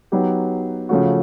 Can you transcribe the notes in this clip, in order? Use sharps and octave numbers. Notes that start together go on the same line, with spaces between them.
F#3 B3 D#4 G4
C#3 F3 A3 C#4 F#4